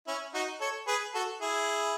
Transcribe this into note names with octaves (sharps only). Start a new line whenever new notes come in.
C#4 E4
D#4 F#4
A4 C#5
G#4 B4
F#4 A4
E4 G#4